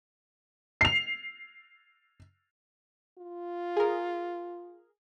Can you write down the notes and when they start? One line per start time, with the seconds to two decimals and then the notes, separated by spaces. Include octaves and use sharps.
0.81 C7 F7
3.18 F4
3.77 G#4 A#4